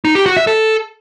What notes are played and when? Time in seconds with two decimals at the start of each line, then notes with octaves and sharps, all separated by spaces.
0.05 D#4
0.15 G4
0.26 F#4
0.37 E5
0.47 A4